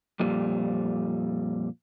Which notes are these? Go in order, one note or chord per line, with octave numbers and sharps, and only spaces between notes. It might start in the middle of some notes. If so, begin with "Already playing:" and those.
F2 A#2 G3